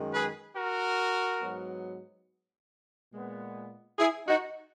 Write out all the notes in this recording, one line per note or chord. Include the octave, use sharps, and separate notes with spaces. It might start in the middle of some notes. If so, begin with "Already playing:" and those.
Already playing: F#2 D#3 G#3
G#4 B4
F#4 A#4
G#2 F#3 B3
A#2 G#3 B3
E4 G#4
D#4 F#4